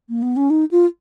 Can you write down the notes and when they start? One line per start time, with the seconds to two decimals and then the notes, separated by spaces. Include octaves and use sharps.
0.09 A#3
0.22 B3
0.36 C#4
0.50 D#4
0.71 F4